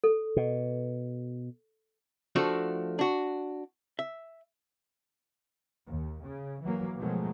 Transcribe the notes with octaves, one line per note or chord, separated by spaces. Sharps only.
A4
B2
F3 A3 D4 F#4 A4
D4 F#4
E5
D#2
C#3
E3 F#3 A#3
B2 D#3 F3 F#3 G#3 A3